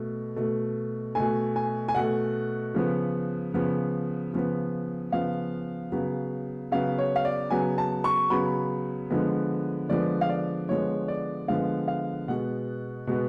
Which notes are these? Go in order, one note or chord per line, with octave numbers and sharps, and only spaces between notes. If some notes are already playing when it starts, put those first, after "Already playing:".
Already playing: B2 A3
B2 A3
B2 A3 G#5
G#5
G#5
B2 A3 F#5
C#3 F3 B3
C#3 F3 B3
C#3 F3 B3
C#3 F3 B3 F5
C#3 F#3 B3
C#3 F#3 B3 F5
C#5
F5
D5
C#3 F#3 B3 G#5
A5
C#6
C#3 F#3 B3 B5
D3 F3 G#3 B3
D3 F3 G#3 B3 D5
F5
D5
D3 F3 G#3 B3 C#5
D5
D3 F3 G#3 B3 F5
F5
B2 G#3 B3 F#5
B2 G#3 B3